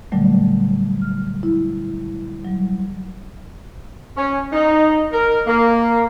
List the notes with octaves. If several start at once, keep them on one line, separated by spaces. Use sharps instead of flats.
A#2 D3 F#3 G3 A3
F6
E4
F#3 G3
C#4
D#4
A#4
A#3